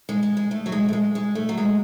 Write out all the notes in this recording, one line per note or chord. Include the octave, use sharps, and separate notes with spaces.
G#3
G#3
G#3
A3
F#3
G#3
A3
G#3
G#3
A3
F#3
G#3